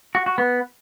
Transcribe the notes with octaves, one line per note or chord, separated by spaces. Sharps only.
F#4
F#4
B3